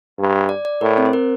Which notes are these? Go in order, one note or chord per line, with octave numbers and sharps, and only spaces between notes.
G2
D5
D5
A2 A#4
C4
C5
A#4